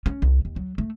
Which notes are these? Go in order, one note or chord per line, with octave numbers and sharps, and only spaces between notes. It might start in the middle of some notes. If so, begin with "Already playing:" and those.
C#4
C2
D#2
F#3
A3